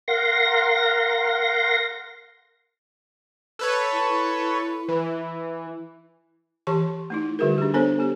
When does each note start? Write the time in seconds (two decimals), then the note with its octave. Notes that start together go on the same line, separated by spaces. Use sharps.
0.08 A#4 F5 F#5 C6 A#6
3.59 A4 B4 C#5
3.93 E4
4.88 E3
6.67 E3 G4 A5 C6
7.10 A3 D#4 E4
7.39 D3 G3 F#4 G#4 A#4
7.58 D4 G4
7.74 B3 D4 A4 C5 C#5
7.99 B3 G4